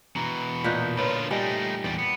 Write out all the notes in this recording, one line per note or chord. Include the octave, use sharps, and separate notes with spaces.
B2 E3 A#5
A#2 D#4 F#6 G6 B6
D3 F4 B4 C#5 B5
G3 A3 D#4 D#5 G#5
E2 G3 D5
B3